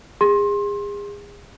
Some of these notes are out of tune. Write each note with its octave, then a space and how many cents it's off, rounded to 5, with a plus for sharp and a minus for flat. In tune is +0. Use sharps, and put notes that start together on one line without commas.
G#4 -35 C6 +25